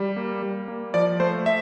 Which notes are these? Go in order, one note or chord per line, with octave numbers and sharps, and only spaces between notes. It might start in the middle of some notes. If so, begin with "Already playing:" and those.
Already playing: G3
A#3
G3
A#3
F3 D5
A3 C5
E5